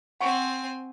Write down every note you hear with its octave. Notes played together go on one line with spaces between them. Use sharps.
C4 F#5 G#5 C#6